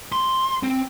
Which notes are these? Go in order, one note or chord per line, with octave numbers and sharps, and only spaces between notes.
C6
C4